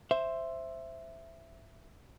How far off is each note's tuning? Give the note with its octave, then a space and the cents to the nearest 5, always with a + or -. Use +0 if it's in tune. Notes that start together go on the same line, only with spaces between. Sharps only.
C5 +5 E5 +10